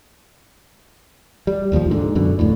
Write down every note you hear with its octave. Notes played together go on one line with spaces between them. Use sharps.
G3
E1 D#2 C3 F3
G#2 D3
F#2 B2 D3
D1 F2 A2